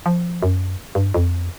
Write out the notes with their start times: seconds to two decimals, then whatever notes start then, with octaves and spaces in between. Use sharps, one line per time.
0.06 F3
0.43 F#2
0.95 G2
1.14 F2